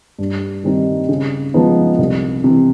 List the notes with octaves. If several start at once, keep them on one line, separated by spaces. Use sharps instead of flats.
G2
D#3 G3 C4 D#4
C#3
F3 G#3 B3 D#4
C2
C3 E3